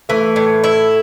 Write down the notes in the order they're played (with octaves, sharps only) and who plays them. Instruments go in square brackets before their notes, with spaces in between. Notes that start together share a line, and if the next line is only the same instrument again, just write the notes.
[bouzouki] E3 [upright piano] A3
[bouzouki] A2
E4